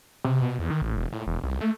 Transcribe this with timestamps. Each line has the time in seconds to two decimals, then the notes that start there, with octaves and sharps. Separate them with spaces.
0.25 C3
0.42 B2
0.59 E2
0.70 D#3
0.82 A1
0.96 E1
1.12 A2
1.27 E1
1.43 C2
1.61 A3